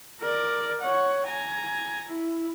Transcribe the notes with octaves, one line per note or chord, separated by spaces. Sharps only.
A#4 D5
C#5 F#5
G#5 A#5
E4